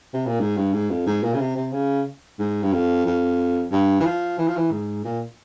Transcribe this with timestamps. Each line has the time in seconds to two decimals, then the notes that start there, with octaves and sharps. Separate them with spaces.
0.14 C3
0.26 A#2
0.40 G#2
0.57 G2
0.73 G#2
0.90 F2
1.07 G#2
1.23 A#2
1.34 C#3
1.40 C3
1.56 C3
1.73 C#3
2.39 G#2
2.63 G2
2.72 F2
3.06 F2
3.72 G2
4.00 E3
4.05 F3
4.38 E3
4.48 F3
4.57 E3
4.71 G#2
5.05 A#2